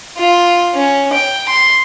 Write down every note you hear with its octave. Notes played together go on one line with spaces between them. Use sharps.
F4
C#4
G5
C6